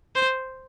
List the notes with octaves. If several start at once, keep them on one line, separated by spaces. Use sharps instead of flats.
C5